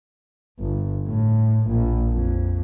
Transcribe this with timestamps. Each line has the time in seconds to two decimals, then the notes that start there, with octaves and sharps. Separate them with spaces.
0.59 G1
1.07 A2
1.67 A#1
2.11 F2